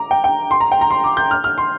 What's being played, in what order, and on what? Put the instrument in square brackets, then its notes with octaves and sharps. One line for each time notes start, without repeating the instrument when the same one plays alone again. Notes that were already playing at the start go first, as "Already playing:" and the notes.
Already playing: [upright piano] A#5 D6
G5
G5
C6
A#5
G5
A#5
C6
D6
G6
F6
F6
C6